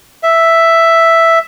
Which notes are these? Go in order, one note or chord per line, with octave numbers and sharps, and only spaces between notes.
E5